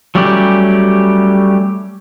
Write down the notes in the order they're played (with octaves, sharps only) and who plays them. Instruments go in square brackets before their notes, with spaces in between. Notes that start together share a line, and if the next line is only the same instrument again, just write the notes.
[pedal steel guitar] F#3 G3 A3 C#4 G4